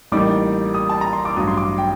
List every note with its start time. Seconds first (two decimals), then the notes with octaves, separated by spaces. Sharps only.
0.12 A1 A2 G3 A#3 D#4 D6
0.74 D#6
0.89 A5
1.01 A#5
1.13 C6
1.25 D6
1.37 A1 G2 F#3 D#6
1.47 C6
1.57 D6
1.78 G5